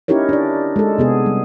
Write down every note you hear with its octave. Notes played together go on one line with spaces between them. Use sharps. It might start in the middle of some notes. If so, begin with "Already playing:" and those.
C#4 D#4 E4 G4 A#4 C#5
D4 D5
G#3 A4
C3 B3 G#4
G3